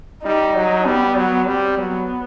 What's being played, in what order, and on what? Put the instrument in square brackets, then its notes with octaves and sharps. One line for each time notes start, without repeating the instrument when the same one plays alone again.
[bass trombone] G3 [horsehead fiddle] D#4
[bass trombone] F#3
[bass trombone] G3 [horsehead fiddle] B3
[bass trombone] F#3
[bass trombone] G3 [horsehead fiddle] C4
[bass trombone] F#3 [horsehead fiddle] B3